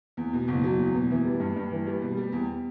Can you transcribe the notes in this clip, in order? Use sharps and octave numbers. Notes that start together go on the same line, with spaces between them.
E2
B2
F#1
F#3
E2
B2
E3
G3
G2
G2
E3
G3
B2
G3
E2